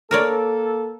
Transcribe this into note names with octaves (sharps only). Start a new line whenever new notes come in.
A#3 A4 A#4 C#5 D5